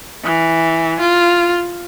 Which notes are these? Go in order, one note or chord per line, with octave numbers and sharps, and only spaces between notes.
E3
F4